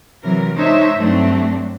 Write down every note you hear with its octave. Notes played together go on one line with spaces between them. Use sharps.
C3 E3 F#3 A#4
G#3 D4 D#4 C5 C#5 E5
G2 F#3 A3 C4 D4